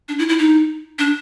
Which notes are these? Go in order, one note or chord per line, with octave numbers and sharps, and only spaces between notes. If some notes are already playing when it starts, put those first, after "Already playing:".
D4
E4
E4
D#4
D4